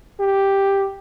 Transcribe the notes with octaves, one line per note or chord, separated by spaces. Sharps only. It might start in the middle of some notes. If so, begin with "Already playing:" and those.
G4